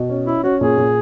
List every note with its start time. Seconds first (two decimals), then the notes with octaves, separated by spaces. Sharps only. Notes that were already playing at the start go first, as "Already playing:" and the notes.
Already playing: B2
0.09 C#4
0.27 C#4 E4
0.44 C#4 F#4
0.61 A#2 G#4
0.77 A#2